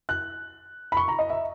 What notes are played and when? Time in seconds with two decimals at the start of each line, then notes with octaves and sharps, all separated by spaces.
0.09 F#6
0.92 B5
0.97 C#6
1.08 A#5
1.19 D#5
1.30 E5